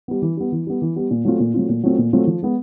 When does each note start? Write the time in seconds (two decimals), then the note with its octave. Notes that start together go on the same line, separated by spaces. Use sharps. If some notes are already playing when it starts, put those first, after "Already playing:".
0.08 G3 B3
0.22 E3
0.37 G3 B3
0.52 E3
0.67 G3 B3
0.82 E3
0.96 G3 B3
1.11 A#2
1.25 F#3 A3 C4 F4
1.40 A#2
1.54 F#3 A3 C4 F4
1.69 A#2
1.83 F#3 A3 C4 F4
1.98 A#2
2.13 F#3 A3 C4 F4
2.27 F3
2.42 G#3 B3